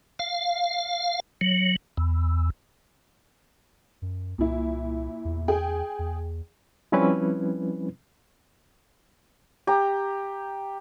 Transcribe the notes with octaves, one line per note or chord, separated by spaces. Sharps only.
F5
F#3
E2
F#2
C2 A#2 E4
E2
G#4 G5
E2
F3 G3 C4 C#4 E4 B4
G4 A#5